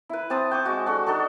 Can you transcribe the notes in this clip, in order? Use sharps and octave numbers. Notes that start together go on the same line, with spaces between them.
E4 B4
C4 A5 D#6
G5 C#6 D6
G#3 F#4
D4 F#4 A4
D4 D#4 F#4 A4